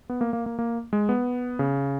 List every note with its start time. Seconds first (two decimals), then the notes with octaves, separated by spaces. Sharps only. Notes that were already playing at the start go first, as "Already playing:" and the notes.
0.09 B3
0.21 A#3
0.33 A#3
0.46 A#3
0.59 A#3
0.93 G#3
1.09 B3
1.59 C#3